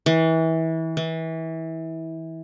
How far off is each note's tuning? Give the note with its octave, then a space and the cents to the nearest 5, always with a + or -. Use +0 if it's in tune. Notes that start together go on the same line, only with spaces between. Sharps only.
E3 -25
E3 -25